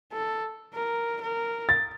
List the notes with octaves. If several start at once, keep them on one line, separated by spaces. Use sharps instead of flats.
A4
A#4
A#4
A6